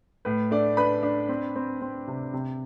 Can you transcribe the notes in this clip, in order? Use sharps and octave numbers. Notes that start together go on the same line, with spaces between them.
A2 B4
A3 D4 D5
D4 B4 B5
D4
C4
C4
C4
C3
C3